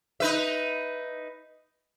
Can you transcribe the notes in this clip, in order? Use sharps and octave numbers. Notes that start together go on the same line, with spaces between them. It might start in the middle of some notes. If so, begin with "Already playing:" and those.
D#4 B4 E5